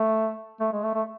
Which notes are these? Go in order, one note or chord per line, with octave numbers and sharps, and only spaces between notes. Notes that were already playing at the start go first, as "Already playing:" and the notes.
Already playing: A3
A3
G#3
A3
A3